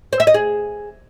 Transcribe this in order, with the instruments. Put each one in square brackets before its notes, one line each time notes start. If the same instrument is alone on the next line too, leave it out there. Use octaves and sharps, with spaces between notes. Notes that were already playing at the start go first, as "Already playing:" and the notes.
[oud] C5
E5
D#5
G#4